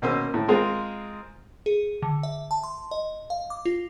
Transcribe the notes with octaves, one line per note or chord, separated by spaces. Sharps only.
B2 A#3 C#4 C5 E6
A2
G#3 C4 F4 G#4 A#4 C5
G#4
D3
E5
A5
C6
D#5
F5
D6
F4